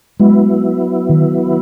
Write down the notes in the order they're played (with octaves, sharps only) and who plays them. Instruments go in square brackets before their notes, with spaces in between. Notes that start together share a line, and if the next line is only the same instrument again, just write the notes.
[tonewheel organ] F#3 B3 E4 [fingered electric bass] G#3
[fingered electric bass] D#3